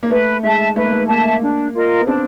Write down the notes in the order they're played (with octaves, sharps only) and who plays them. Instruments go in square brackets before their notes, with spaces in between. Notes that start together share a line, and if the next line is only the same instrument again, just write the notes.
[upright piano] A#3
[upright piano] A3 [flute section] B4
[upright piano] G#3 [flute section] E5 A5
[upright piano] A3 [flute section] B4
[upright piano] A#3
A3
[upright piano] A#3 [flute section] E5 A5
[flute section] D4
F4 A#4 D#5
[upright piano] B3
[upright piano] C4 [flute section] D4